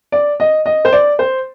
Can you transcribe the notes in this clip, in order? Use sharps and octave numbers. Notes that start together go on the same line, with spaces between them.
D5
D#5
D#5
C5
D5
C5